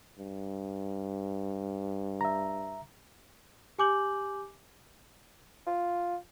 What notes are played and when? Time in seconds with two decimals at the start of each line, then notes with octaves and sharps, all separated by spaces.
0.19 G2
2.21 E5 A#5
3.79 G4 G#5 D6 G6 F#7
5.67 F4